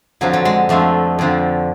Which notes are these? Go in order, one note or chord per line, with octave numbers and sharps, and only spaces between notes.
F2 D3 F3 F#3
F#3
G#3
F2 D3 F3 A3
F2 D3 F3